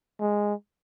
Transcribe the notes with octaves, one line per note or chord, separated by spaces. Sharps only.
G#3